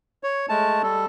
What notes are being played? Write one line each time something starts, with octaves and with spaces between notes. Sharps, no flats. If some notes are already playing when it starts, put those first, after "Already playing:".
C#5
G#3 A3 A5
G3 A4